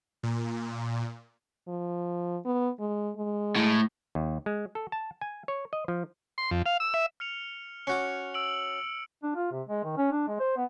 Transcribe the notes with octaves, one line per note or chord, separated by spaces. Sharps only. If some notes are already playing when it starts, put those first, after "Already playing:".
A#2
F3
B3
G#3
G#3
A2
D#2
G#3
A4
A5
G#5
C#5
D#5
F3
C6
F2
F5
E6
E5
F6 C#7 F7
C#4 F#4 D6 C#7
E6 D7 F#7
D4
F4
C3
G#3
D#3
C#4
D4
G#3
C5
B3